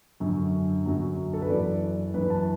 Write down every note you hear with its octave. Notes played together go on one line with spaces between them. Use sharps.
F#2 D3 F#3
F#2 D3 F#3
A4
B4
F#2 E3 D5
F#2 E3 B4
A5